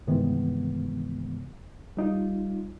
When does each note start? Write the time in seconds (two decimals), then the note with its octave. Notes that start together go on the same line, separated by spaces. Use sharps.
0.07 G2 C3 D#3 E3 G#3 B3
1.97 G3 D#4 F4